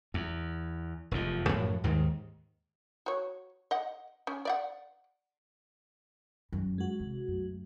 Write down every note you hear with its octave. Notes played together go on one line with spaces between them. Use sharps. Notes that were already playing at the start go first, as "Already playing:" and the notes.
E2
F1 E2 F3
F#2 A2 F3 F#3
D#2 G#2 D#3
F#4 C#5
D#5 F#5
C#4
D5 E5 F#5
F#2
G#3 F#4
C3
F#2 A3